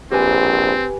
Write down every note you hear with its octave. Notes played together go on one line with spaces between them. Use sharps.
A#1 C4 G4 B4 G#5